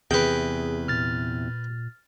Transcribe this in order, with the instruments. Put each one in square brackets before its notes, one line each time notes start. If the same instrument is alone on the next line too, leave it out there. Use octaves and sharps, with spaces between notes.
[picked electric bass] E2 C3 [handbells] G#4 [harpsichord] B4 G5
[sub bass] A#2 [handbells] F6 A6